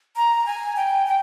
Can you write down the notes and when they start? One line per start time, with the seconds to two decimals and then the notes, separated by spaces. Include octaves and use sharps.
0.16 A#5
0.46 G#5
0.76 G5
1.07 G5